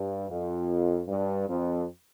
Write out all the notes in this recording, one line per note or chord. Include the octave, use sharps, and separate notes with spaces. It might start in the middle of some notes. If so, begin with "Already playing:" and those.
Already playing: G2
F2
G2
F2